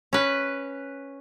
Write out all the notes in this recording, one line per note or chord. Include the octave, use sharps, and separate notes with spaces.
C#4 B4